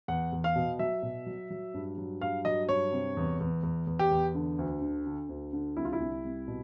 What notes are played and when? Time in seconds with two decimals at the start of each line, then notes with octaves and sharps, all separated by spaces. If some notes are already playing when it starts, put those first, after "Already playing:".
0.08 E2 F#5
0.32 E2
0.44 F5
0.56 B2
0.79 F#3 E5
1.03 B2
1.26 F#3
1.50 F#3
1.74 G2
1.98 F#3
2.21 G2 F5
2.45 F#3 D#5
2.69 G2 C#5
2.92 C3
3.17 E2
3.40 E2
3.63 E2
3.87 E2
3.99 G4
4.11 E2
4.35 D3
4.58 D2
4.82 D3
5.06 D3
5.29 D2
5.53 D3
5.77 C2 E4
5.85 F4
5.93 E4
6.00 C2
6.24 C2
6.48 B2